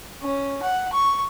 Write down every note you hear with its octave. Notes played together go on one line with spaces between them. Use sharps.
C#4
F#5
C#6